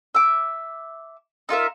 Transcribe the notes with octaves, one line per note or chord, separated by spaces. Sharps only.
E5 D6
D#4 F4 A#4 E5